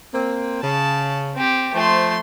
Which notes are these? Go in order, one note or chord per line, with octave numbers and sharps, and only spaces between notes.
A#3 C4
C#3 A5
C4 G4
F3 A3 C5 C6